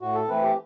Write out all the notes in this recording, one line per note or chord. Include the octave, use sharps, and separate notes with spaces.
A2 F#4
A4
E3 A3 C4 B4
G4